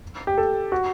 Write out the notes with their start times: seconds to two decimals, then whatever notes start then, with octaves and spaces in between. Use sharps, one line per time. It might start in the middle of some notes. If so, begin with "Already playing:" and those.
0.27 G4
0.38 A4
0.72 F#4